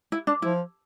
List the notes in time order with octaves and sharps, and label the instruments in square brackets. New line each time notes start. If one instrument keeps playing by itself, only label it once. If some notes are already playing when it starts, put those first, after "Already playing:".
[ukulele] E4
D4
[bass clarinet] F3 [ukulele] E4